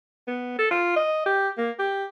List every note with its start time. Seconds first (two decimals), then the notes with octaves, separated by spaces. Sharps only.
0.27 B3
0.58 A4
0.71 F4
0.96 D#5
1.26 G4
1.58 A#3
1.79 G4